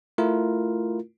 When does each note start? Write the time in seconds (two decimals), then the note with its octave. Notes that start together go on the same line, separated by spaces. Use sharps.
0.18 A3 E4 F4 A#4